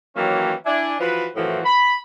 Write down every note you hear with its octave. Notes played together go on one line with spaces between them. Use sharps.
D#3 E3 F#3 A#3 C#4 G4
D4 E4 G#5
E3 F3 F#4 B4
F#2 A2 E3 F3 C4 F#4
B5